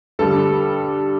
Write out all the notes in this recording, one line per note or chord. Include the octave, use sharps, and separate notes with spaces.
G2 D3 G3 A4